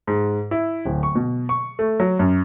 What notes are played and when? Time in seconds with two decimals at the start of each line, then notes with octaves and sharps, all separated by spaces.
0.07 G#2
0.51 E4
0.85 D1
1.03 C#6
1.15 B2
1.49 C#6
1.79 A3
2.00 F#3
2.19 F#2